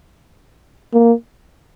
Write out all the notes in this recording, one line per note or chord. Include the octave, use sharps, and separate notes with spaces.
A#3